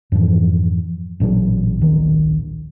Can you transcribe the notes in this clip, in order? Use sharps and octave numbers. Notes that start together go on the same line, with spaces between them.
F2 G#2 E3 F3
A1 A#2 C#3 F#3
D1 A#1 D#3